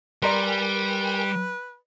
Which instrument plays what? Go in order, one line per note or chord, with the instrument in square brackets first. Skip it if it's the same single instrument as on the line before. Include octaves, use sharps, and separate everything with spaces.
[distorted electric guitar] G3 [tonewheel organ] A#4 G5 G#5 [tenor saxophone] B4 [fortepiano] D5 A#5 C6